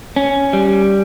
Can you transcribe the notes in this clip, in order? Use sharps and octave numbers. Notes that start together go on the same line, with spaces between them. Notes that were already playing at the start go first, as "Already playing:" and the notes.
C#4
G3